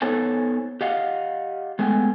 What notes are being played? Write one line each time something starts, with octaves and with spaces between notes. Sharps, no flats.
B3 D#4 A4 C5 C#5 G#5
G4 D#5 F5 F#5
G#3 A3 B3 G5 G#5